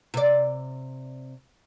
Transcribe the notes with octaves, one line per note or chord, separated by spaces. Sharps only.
C3 D5